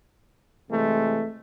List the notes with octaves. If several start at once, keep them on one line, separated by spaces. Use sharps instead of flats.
C3 E3 G#3 A3